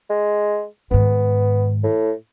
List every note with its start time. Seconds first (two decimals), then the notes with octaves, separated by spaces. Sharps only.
0.10 G#3
0.91 G#2 D#3 B3
1.84 A2